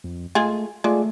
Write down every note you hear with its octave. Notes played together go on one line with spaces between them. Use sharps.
F2
G#3 A3 F4 G#4
G#3 A3 F4 G#4 D5